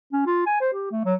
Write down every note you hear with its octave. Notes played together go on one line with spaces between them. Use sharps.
C#4
F4
G#5
C5
G4
A3
F#3